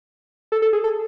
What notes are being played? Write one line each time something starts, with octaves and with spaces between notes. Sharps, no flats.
A4
A4
G#4
A4